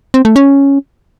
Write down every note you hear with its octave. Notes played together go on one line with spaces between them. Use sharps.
C4
A3
C#4